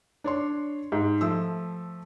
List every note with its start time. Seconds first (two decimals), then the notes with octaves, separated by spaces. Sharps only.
0.24 D4 C#5 C6
0.92 G#2
1.21 F3 A3 E6